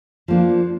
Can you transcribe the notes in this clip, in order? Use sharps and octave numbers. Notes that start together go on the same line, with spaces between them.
F3 A#3 D4